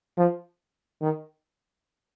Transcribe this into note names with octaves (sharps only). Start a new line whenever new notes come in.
F3
D#3